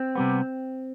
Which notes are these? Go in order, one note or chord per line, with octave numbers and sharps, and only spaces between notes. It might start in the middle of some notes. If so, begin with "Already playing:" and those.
Already playing: C4
C3 G3 B3